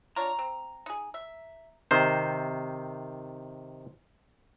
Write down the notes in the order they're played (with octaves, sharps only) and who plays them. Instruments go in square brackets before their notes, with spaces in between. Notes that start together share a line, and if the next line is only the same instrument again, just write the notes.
[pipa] D4 F4 C#5 [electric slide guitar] A#5
[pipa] C4
D#4 G#4
E5
[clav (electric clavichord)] C3 D#3 C5